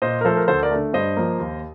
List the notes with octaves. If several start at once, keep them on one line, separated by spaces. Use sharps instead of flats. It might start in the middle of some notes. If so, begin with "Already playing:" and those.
A#2 C5 D#5
A#4
F3 A3 A4 C5
A#4
D2 A4 C5
A#4 D5
D3 A3
G2 C5 D#5
F3 A#3
D#2